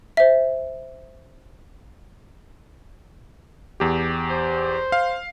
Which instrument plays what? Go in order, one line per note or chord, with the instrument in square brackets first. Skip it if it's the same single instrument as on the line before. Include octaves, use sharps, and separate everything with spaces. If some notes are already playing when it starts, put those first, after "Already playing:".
[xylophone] C5 E5
[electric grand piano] E2 G4
[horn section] C5
[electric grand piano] F5